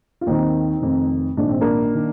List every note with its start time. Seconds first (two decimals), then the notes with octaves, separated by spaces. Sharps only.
0.21 F4
0.26 D#2 D#3 C4 D#4
0.82 F1 F2 D#3
1.37 A#1 G#2 D#3 D4
1.49 C4
1.61 A#3 D4
1.95 D#3